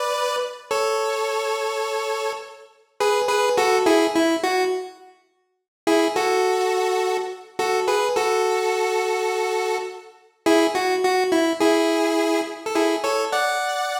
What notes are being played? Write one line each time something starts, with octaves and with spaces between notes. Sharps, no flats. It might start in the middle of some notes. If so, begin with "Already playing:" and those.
Already playing: B4 D5
A4 C#5
G#4 B4
G#4 B4
F#4 A4
E4 G#4
E4
F#4
E4 G#4
F#4 A4
F#4 A4
G#4 B4
F#4 A4
E4 G#4
F#4
F#4
E4
E4 G#4
A4
E4 G#4
A4 C#5
D5 F#5